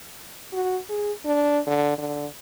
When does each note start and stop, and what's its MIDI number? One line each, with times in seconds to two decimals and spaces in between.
0.53 0.78 66
0.90 1.12 68
1.25 1.59 62
1.66 1.94 50
1.98 2.26 50